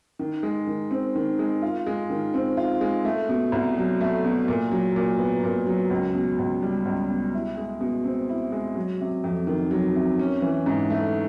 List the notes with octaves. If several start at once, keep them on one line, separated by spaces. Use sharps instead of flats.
D#3
G#3
D#3
C4
D#3
G#3
F4
G#3
D#3
C4
F4
G#3
A3
B2
C2
F#3
A3
B2
A#2
F#3
A#2
B3
A#2
F#3
C#2
B2
C#2
G3
C#2
B2
E4
G#3
B2
C4
E4
G#3
F#3
C3
F2
D#3
F#3
C3
C#4
E3
G#2
A3